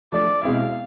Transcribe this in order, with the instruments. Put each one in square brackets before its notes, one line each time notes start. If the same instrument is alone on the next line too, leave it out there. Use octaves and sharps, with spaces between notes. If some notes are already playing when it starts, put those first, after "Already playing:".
[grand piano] F3 A3 D4 [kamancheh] D5
[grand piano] B2 G#3 C4 E4 [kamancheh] F5